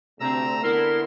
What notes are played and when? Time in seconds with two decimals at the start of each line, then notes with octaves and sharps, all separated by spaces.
0.20 D2 C3 A3 C4 A#5 E6
0.63 D3 B3 E4 A#4 C6